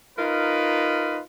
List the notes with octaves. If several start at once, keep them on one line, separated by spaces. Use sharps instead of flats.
D#4 F4 A#4 B4